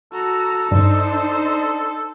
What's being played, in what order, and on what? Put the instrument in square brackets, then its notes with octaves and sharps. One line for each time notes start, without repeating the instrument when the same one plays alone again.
[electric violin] F#4 A#5 [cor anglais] A4
[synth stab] G2 [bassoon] D4 [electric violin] D#4 C5